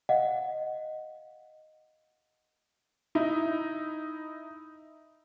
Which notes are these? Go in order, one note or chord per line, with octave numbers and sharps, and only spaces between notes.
D#5 F5 F#5
D#4 E4